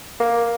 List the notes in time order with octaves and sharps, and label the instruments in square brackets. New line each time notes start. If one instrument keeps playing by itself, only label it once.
[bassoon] A#3